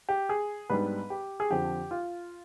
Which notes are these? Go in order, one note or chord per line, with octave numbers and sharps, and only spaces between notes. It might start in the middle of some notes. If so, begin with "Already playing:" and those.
G4
G#4
G#2 G3 B3 D4 B4
G4
G#4
F2 D3 F3 C4 G4
F4